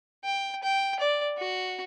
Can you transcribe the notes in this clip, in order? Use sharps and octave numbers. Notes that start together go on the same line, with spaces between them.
G5
G5
D5
F#4